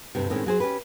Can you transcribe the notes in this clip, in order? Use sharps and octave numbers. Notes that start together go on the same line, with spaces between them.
D2 G2 C3
A2 D#3 G#3 C4 C#4
F#3 G#4 C5
C#4 G4 B4